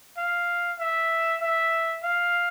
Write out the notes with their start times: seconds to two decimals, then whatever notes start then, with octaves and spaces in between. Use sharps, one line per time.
0.17 F5
0.79 E5
1.41 E5
2.03 F5